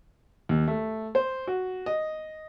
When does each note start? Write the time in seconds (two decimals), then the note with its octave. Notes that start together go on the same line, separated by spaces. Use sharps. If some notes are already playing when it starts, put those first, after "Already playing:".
0.49 D#2
0.68 A3
1.15 C5
1.47 F#4
1.86 D#5